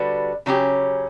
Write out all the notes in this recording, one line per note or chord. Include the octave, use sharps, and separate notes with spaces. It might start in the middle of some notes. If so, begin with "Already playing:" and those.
Already playing: D3 G3 D4 F#4 B4
C#3 F#3 C#4 G4